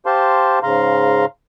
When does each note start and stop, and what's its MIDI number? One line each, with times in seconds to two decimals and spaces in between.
0.06 0.59 67
0.06 0.59 72
0.06 0.59 77
0.06 0.59 81
0.06 0.59 84
0.63 1.25 44
0.63 1.25 49
0.63 1.25 77
0.63 1.25 82
0.63 1.25 84